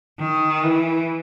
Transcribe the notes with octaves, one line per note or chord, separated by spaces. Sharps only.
D#3
E3